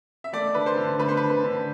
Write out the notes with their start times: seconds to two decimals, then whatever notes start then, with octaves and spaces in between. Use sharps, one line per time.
0.24 E5
0.33 A3 D5
0.55 D3 B4
0.66 C5
0.77 D3
0.99 A3 B4
1.08 C5
1.17 D3 B4
1.44 D3